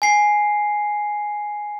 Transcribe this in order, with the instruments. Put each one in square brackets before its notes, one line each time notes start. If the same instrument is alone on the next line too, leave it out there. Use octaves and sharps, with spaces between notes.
[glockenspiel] G#5 C7